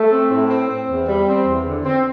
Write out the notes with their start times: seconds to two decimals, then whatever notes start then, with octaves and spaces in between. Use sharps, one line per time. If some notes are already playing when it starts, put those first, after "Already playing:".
Already playing: A3
0.12 C4
0.31 A2
0.50 C4
0.69 C4
0.89 E2
1.08 G3
1.28 C4
1.47 E2
1.66 D3
1.86 C4